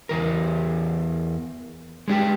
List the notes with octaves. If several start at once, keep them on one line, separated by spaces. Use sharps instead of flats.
E2 E3 A#4
G#3 D4 G4